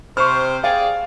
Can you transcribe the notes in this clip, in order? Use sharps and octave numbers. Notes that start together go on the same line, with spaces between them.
C3 C5 B5 C#6 F6
G#4 D5 F5 G5